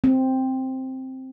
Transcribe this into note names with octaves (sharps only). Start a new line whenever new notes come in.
C4